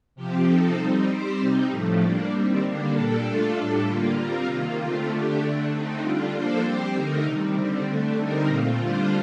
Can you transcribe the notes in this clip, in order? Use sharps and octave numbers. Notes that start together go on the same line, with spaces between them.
C3 F3 C4 G4
C3 F3 C4 D#4 A4
G3 C4 D#4
G3 C4 G4 C5
C3 G3 C4 D#4
A2 F3 A3
G3 A#3 D4
D#3 G3 C4
D3 G3 A#3 D4
A#2 G3 D4 A4
A3 D4 F4 A4
A2 G3 D4 A4
D3 G3 A#3 F4
G3 C4 F4 A#4
C3 D#3 A#3 F4
D3 A3 C4 F4
D3 A3 D4 G4
D3 A3 D4
D3 A3 C4 D#4
D3 G3 D4 F4
F3 A#3 D4 A4 C5
G3 C4 G4 C5
D3 A3 D#4 A#4
C3 D#3 G3
D3 G3 C4
D3 A3 D4
D3 G3 C4 D#4 A#4
A#2 A3 C4 F4
D3 G3 D4 F4 C5